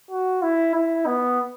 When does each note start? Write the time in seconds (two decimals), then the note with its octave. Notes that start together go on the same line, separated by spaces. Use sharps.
0.11 F#4
0.42 E4
0.75 E4
1.06 B3